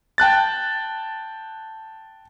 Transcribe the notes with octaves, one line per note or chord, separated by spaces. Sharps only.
G5 A5 F#6 A6